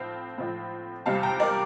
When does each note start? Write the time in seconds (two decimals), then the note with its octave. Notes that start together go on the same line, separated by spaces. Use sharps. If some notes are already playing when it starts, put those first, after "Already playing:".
Already playing: A2 F3 C4 F5 A5
0.38 A2 F3 C4
1.06 E2 C3 G3 C4 F5 A5
1.23 G5 A#5
1.40 A#4 D5